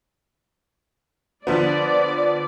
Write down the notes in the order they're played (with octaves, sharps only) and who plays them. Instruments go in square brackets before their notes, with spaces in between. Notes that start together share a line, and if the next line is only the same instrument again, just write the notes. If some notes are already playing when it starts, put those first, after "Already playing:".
[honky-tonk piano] D3 F3 B3 [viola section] D5